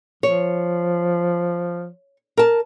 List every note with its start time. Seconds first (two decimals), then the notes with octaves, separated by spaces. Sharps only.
0.23 F3 C#5
2.37 A#4 A5